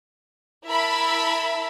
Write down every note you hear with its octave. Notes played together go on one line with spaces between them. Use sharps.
E4 A#4 E5 A5 B5